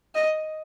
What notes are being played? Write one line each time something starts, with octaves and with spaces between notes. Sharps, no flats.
D#5